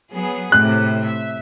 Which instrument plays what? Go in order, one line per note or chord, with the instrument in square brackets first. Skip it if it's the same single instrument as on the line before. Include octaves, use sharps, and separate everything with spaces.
[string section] F#3 B3 G#4
[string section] A2 C3 [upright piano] F#6
[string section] E5